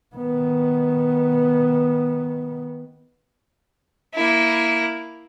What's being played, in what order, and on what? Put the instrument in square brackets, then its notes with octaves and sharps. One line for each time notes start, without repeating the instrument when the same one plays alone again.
[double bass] D#3 B3
[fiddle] A#3 E4